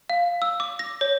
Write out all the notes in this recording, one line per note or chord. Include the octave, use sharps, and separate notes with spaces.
F5
E6
D6
A#6
C#5